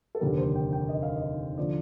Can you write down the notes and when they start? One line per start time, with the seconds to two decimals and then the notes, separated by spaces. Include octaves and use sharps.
0.15 A4
0.21 F1 D#2 D3 G3 A#4
0.38 C5
0.55 G5
0.73 G5
0.89 D#5
1.03 F5
1.16 D#5
1.57 D3 F3 D5